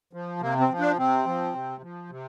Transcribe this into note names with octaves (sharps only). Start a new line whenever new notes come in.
F3
C3 A#3
C4
F3
D4
C3 C4
F3
C3
F3
C3